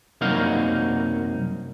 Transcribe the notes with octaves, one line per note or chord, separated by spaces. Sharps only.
C2 F#2 A#3 D#4 F#4 F5